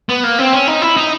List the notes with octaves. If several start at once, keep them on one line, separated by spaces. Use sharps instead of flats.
B3
A#3
C4
C#4
D#4
E4
D#4